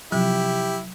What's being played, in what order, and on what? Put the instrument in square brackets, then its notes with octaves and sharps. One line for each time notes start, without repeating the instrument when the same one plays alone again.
[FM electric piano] C3 F3 [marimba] F#3 [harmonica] E4 [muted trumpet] G4